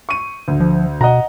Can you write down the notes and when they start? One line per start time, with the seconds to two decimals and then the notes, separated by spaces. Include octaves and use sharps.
0.09 C#6 D#7
0.48 D2
0.60 F3
1.01 B2 D#5 F#5 A#5